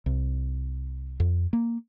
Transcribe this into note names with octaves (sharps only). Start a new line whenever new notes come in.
C2
F2
A#3